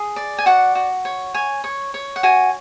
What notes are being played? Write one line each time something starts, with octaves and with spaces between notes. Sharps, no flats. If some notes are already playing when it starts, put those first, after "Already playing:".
Already playing: G#4
D5
G#5
F#4 F#5
F#4
C#5
C#5 G#5
C#5
C#5
F#5
F#4 G#5